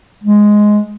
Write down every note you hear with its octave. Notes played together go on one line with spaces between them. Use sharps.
G#3